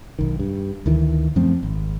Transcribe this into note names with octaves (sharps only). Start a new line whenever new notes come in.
B1 D#3
G2
D2 D#3 E3
F#2 F3 A3 C4
G#1